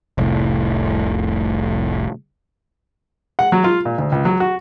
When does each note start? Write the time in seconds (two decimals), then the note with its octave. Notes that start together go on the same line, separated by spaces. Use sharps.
0.18 F1 C2 A2
3.39 F#5
3.52 F#3
3.64 F4
3.85 A#2
3.98 D2
4.12 C#2
4.25 F#3
4.40 F#4